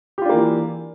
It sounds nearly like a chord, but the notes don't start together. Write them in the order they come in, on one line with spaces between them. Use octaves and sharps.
G4 F4 D4 A#3 E3